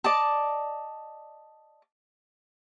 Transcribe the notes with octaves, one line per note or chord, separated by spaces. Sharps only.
D5 D#5 A5